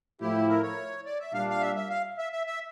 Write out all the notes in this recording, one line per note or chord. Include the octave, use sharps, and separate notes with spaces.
A2 F3 A3 E4 G4
A#4
C#5
D5
E5
A#2 G3 D4 F5
F5
E5
E5
F5
E5
E5
E5